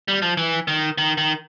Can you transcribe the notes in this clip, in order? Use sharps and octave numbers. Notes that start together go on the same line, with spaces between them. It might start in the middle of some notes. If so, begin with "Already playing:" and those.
G3
F3
E3
D#3
D#3
D#3